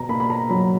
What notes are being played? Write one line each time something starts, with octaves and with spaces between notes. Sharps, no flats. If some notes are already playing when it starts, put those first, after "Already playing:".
Already playing: B2 A#5
A#3 B5
B5
A#5
F#3 B5